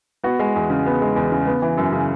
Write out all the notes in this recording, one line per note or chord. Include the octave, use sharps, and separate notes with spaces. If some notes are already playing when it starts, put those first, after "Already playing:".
B3 F#4
G#3
E2
C#3
B3
G#3
E2
C#3
B3
E3
F#2
C#3